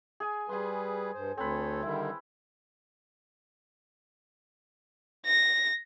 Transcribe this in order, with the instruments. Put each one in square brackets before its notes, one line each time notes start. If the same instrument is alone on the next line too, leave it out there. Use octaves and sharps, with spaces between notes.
[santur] G#4 G#5
[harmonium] G3 G#4 B4 [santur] G#5 C6
[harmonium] G2 C5
[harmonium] D2 A4 C#5 [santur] C4 B4
[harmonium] D3 D#3 G3 [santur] E4
[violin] A#6